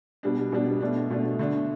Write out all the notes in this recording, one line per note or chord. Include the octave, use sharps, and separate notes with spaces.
B2 G3 D4
B2 G3 D4
B2 A3 D4
B2 A3 D4
D3 A3 D4